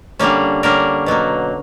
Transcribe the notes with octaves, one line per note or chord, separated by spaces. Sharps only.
D3 G3 A#3 C#4
D3 G3 A#3 C#4 A#4
B2 F#3 A#3